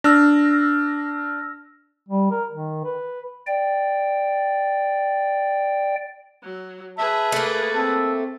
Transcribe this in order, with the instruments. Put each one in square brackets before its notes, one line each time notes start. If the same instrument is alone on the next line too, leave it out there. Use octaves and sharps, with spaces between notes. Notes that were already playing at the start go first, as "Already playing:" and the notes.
[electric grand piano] D4 [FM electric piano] E6 F6 A#6
[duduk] G3
A#4
D#3
B4
[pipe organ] D5 G5
[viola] F#3
[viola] G#4 B4 [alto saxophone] E5 [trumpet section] A5
[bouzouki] A3 A#3
[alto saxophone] C4 [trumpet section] E5 A5